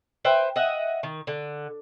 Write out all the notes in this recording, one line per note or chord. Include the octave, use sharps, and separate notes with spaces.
B4 C5 E5 G5
D#5 E5 F#5
D#3
D3